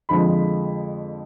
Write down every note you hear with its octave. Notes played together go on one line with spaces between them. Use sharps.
F2 D3 F3 G#3 B5